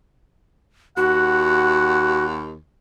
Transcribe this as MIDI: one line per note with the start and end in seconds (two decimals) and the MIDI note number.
0.97 2.58 39
0.97 2.24 66
0.97 2.38 78